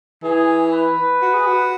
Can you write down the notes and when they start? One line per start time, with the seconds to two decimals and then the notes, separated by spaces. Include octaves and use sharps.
0.23 E3 G#4
0.72 B4
1.22 F#4
1.34 G#4
1.47 F#4